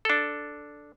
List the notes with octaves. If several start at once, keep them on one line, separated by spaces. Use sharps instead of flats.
D4 A4